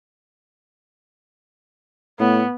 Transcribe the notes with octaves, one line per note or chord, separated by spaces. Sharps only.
A2 B3